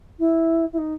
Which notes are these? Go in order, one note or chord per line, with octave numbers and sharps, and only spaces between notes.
E4
E4
D#4